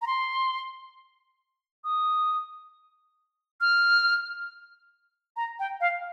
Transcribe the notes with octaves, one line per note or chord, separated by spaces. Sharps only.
A#5
C6
D#6
F6
A#5
G5
F5